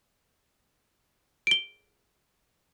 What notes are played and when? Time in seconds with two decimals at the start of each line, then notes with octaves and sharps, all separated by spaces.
1.47 D7 G7